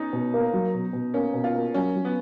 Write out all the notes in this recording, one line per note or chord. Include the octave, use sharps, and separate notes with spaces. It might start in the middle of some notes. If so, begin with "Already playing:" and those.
Already playing: B3 C#4 D#4
B2
A#3
F#3
B2
B2
A#3 C#4
B2
F4
A#3
F#3 C#4
F#3
B3